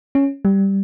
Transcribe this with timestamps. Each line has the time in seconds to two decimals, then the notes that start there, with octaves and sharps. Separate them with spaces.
0.15 C#4
0.45 G3